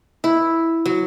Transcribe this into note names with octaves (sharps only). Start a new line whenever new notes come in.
E4
F#3